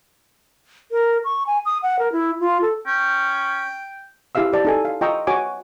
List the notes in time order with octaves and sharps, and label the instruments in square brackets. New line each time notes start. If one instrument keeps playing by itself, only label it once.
[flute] A#4
C#6
G#5
D#6
F#5
A#4
E4
F4
A4
[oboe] C#4 [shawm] G5
[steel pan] E4 G4 E5 F5 E6
G4 D5 A5
D#4 A4 G#5
F5
F4 D#5 G5 A#5 C#6 E6
F#4 C#5 G#5 D6